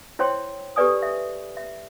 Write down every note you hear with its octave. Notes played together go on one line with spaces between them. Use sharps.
E4 C5 C#5 G5 C6
G4 A4 B4 D5 G#5 D#6
E5
E5